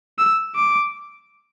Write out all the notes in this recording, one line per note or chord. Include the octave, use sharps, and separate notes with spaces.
E6
D6